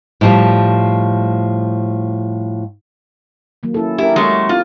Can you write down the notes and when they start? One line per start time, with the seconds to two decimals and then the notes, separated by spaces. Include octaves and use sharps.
0.21 A2 F3 G3
3.63 D#3 F#3 A#3
3.74 C#4 E4 A4
3.98 E4 G4 A#4
4.16 F#3 G#3 A3
4.49 C4 E4 F4